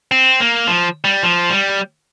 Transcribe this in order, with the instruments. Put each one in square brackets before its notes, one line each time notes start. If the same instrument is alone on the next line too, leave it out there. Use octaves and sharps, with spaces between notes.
[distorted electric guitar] C4
A#3
F3
G3
F3
G3